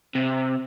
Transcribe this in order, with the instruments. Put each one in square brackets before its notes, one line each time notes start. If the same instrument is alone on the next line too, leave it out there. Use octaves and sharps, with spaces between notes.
[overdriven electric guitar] C3 [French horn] C4